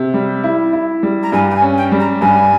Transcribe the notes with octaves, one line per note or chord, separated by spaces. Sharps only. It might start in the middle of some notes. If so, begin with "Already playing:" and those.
Already playing: C3
G3
E4
E4
G3
A#5
G2 G#5
G5
G#5
C#4
G5
G3
A#5
G2 G#5